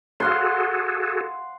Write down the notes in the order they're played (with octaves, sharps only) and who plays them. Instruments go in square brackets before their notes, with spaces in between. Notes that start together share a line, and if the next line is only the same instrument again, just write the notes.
[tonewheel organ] F#4 G#4 A4 [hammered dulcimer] F5 F#5 C6